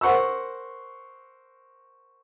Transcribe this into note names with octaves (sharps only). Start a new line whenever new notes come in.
A#4 C5 F#5 C#6 E6